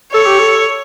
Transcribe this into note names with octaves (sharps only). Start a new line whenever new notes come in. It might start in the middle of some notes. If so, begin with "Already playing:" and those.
A4 C#5
G4
A4